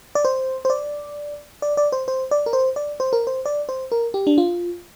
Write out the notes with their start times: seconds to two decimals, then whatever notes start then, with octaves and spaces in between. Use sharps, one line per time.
0.15 D5
0.25 C5
0.65 C5
0.70 D5
1.62 D5
1.77 D5
1.92 C5
2.08 C5
2.31 D5
2.46 A#4
2.53 C5
2.76 D5
3.00 C5
3.13 A#4
3.27 C5
3.46 D5
3.69 C5
3.92 A#4
4.14 G4
4.27 D4
4.38 F4